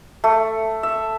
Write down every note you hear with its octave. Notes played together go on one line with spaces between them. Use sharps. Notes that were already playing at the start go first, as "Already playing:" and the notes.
A3
E5